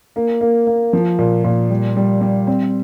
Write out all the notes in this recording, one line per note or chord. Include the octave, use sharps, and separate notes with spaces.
A#3
A#3
A#3
F3
A#2
A#2
G3
G3
G3
C4